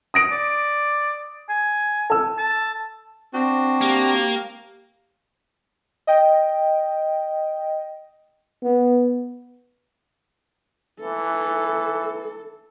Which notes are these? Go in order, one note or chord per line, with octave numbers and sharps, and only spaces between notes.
D#6 A#6 D7
D5
G#5
A4 E6
A5
C4 D4 F#4
A#3 G4
D#5 G5
B3
E3 A4